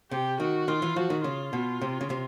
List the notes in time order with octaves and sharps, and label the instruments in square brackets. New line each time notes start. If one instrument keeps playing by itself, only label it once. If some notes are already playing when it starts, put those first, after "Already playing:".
[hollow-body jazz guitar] C3 [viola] G4
[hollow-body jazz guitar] D#3 [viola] F#4
[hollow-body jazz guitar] D#3 [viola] F4
[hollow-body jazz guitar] E3
[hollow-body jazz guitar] F3 [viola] F#4
[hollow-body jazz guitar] D#3
[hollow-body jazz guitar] C#3 [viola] F4
[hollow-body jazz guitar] B2
C3
C#3
C3